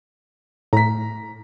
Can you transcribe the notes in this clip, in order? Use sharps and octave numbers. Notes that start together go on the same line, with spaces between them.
A2 A#5 B6